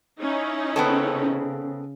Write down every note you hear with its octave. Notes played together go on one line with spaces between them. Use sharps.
C#4 D#4 E4
C#3 B3 C4 A4